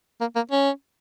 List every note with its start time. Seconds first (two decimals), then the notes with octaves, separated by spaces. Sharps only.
0.21 A#3
0.36 A#3
0.51 C#4